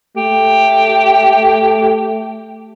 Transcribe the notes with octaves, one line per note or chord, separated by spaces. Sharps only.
A3 G4